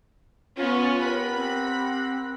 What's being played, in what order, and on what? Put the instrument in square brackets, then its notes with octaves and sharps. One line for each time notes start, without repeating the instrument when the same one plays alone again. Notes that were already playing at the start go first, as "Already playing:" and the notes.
[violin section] B3 C#4 [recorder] F4
[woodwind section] G4 A#4 F#5 [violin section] B5
[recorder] C4